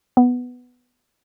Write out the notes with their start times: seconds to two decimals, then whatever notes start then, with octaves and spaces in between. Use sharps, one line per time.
0.17 B3